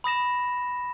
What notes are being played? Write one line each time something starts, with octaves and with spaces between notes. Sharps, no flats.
B5 D#6 A#6 E7